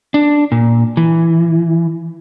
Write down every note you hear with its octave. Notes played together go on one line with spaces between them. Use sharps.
D4
A#2
E3